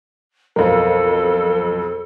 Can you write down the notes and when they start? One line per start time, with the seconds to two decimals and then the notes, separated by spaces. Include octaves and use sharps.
0.56 B1 F2 A4 A#4 F5